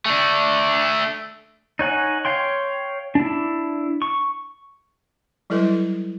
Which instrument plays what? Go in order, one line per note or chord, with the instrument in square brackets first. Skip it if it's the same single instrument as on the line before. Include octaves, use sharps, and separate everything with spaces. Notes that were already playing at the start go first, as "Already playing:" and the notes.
[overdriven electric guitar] A3 D4
[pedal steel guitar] D#4 C#5 F#5 G#5
C#5 F5 G5 C6
D4 E4
C#6
[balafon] F#3 G3 E4 A4 B4